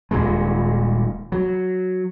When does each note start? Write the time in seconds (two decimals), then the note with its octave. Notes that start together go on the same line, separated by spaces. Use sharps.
0.11 D#1 D#2 A#2 G#3
1.32 F#3